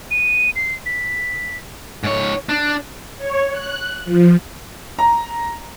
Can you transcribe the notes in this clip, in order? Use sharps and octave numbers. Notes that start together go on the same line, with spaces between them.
D#7
C7
B6
G#2 C#5
D4
C#5
F#6
F3
A#5